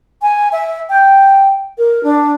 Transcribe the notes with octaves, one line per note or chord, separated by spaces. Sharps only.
G#5
E5
G5
A#4
D4